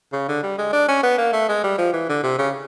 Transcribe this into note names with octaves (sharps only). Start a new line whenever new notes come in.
C#3
D3
G3
G#3
D4
C#4
B3
A#3
A3
G#3
G3
F3
E3
D3
C3
C#3